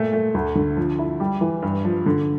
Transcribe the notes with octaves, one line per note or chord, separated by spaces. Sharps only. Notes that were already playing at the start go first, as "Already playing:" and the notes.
Already playing: A#2 A3
A3
D2
D3
F3
E4
G3
E3
G2
F3
D3